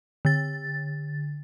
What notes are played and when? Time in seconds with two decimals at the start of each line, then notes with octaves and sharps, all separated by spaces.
0.25 D3 A6